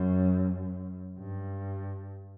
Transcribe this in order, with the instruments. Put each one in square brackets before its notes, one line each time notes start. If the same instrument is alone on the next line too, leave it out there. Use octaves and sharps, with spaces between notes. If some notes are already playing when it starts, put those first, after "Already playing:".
Already playing: [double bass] F#2
G2